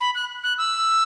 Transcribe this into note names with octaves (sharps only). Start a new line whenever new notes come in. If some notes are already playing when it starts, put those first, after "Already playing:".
B5
F#6
F#6
E6